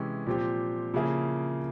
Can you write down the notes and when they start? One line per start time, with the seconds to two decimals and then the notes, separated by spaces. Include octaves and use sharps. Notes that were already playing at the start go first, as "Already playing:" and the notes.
Already playing: C3 E3 G#3 C#4
0.27 A#2 F3 C4 G4
0.94 C#3 F3 A#3 E4 G#4